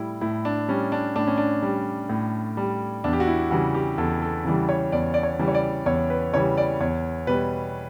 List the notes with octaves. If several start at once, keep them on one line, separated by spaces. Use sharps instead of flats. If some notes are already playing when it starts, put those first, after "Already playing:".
Already playing: A2 G3 E4
A2 E4
D4
G3 C#4
D4
A2 D4
C#4
D4
G3
A2
G3
E2 D4
G4
F#4
E4
C#3 E3 G3 F#4
G4
E2 A4
A4
C#3 E3 G3
C#5
E2 D5
D5
C#5
C#3 E3 G3
C#5
D5
E2 C#5
B4
C#3 E3 G3 C#5
D5
E2 C#5
B2 G3 B4